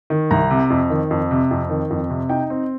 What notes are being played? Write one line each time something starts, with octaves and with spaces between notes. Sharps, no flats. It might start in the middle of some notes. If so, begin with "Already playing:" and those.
D#3
C2 A#5
C3
F2
D#3
F2
C3
F2
D#3
F2
C3
D#4 G5
C4